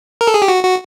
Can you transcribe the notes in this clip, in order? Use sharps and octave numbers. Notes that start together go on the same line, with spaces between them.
A#4
A4
G#4
G4
F#4
F#4